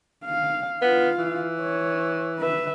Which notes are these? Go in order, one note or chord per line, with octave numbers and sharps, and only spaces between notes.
F5
B3 F4 F5
E3
C#5
B4 E5